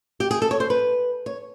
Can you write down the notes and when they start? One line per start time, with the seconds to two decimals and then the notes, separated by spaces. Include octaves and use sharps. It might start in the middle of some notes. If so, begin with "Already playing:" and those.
0.20 G4
0.31 G#4
0.42 A4
0.51 C#5
0.60 C5
0.70 B4
1.26 C#5